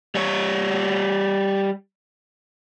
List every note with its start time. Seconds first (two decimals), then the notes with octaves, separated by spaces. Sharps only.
0.15 G3 C#5